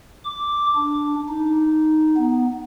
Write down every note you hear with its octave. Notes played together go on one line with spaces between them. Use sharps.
D6
D4
D#4
B3